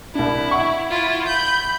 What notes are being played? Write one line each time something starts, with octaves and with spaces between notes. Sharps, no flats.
C2 D4 E4
E5 F#5 C#6
E4 F4
B5 G6